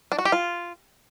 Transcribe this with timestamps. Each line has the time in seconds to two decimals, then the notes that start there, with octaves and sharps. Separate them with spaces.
0.12 D4
0.19 F#4
0.25 G4
0.32 F4